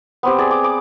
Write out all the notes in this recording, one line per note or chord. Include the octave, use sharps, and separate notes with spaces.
B3 C4 G4
G#4 D5
D6
D6